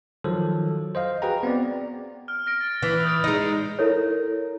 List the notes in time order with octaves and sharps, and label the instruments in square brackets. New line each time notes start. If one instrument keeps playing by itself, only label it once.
[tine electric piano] D#3 F3 F#3 A4
C5 D#5 F5
F#4 G#4 B4 G5 A#5
B3 C4 D5
[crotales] F6
F6 A#6 D7
A6
[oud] E3
[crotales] D#6 G6 D7
[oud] G#3 D#4 [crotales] A#6
[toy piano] E4 A4 A#4 C#5